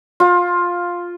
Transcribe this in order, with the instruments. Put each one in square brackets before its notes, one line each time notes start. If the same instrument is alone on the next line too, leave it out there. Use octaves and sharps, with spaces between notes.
[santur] F4